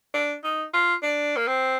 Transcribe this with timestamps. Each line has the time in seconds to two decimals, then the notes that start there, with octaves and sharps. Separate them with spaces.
0.14 D4
0.44 D#4
0.74 F4
1.03 D4
1.37 A#3
1.48 C4